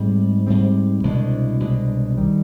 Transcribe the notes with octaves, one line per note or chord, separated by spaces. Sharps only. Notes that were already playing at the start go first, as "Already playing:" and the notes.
Already playing: G#2 G3 C4
G#2 G3 C4
C2 B2 G#3 D4
C2 B2 G#3 D4
D#3 G3